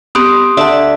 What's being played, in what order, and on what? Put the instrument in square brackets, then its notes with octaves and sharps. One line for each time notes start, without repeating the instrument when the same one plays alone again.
[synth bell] B3 C4 G4 [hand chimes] C6 D#6
[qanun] D3 D4 E5 [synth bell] D5 A5